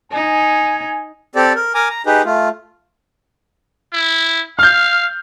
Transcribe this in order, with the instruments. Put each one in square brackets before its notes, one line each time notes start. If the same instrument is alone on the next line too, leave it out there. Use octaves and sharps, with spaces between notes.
[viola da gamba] D#4 [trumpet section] G#5
[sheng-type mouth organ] C4 G4 A4 D5
A#4
A#4 G#5 A#5 D6
A#5
D#4 G4 G#4 B4
A3 F4
[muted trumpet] E4
[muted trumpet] F5 [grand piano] F6 G6